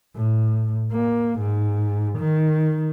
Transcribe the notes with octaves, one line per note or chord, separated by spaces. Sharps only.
A2
A#3
G#2
D#3